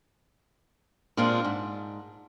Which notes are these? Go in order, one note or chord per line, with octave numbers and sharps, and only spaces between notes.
A#2 G#3 C4 D4 F4
G#2